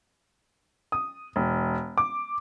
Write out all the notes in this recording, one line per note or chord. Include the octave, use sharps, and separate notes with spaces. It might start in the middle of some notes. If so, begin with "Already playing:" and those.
D#6
E1
D6